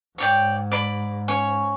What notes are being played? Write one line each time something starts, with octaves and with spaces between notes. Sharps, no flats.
G#2 C#5 D5 G5
D5 B5
C#4 C#5